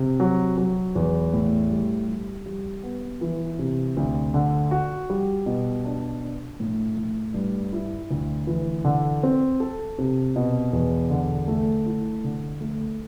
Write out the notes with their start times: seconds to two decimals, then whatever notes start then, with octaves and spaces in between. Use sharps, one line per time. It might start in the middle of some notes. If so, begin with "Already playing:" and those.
Already playing: C3
0.20 F#3
0.58 F#3
0.95 E2
1.34 A2
1.70 G3
2.08 G3
2.46 G3
2.83 B3
3.21 E3
3.59 C3
3.97 D2
4.34 D3
4.71 F#4
5.10 G3
5.46 B2
5.85 D4
6.22 D4
6.60 A2
6.97 A2
7.34 G2
7.73 E4
8.11 D2
8.47 E3
8.85 D3
9.23 C4
9.60 A4
9.99 C3
10.36 B2
10.73 E2
11.10 D3
11.48 A3
11.86 E4
12.24 D3
12.61 A3